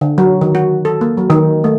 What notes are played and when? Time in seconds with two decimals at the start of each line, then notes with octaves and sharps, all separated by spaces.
0.01 D3
0.18 F#3
0.41 D#3
0.55 F#4
0.85 A4
1.01 A#3
1.17 F#3
1.30 D#3
1.64 A3